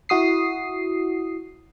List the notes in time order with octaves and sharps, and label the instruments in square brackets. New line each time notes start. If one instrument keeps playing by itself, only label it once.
[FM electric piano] E4 F#4 D#6 C7